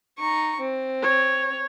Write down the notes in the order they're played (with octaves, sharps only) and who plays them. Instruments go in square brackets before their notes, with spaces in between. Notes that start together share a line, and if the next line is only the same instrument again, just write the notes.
[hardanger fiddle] D#4 C#6
C4
[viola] C#5